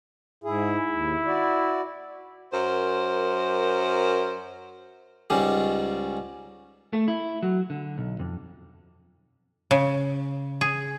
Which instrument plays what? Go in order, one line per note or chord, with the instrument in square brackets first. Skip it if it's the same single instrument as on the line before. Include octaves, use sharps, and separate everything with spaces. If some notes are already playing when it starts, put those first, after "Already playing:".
[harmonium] G#2 G#4 [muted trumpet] E4
[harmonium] D#2
F#4 D5
[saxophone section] F#2 A#4 C5
[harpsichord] C#2 G#2 C#3 G3
[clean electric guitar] A3
E4
F#3
D3
B1
F2
[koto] C#3
G#4